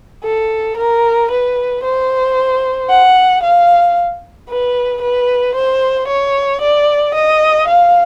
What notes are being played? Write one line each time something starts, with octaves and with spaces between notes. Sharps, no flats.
A4
A#4
B4
C5
F#5
F5
B4
B4
C5
C#5
D5
D#5
F5